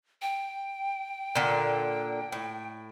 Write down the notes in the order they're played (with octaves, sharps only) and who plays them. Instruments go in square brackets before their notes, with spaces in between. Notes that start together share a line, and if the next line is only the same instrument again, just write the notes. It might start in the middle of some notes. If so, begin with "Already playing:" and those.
[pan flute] G5
[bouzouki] A#2 D3
A2